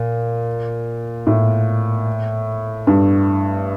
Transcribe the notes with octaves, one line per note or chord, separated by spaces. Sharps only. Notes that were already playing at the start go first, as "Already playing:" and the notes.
Already playing: A#2
A2
G2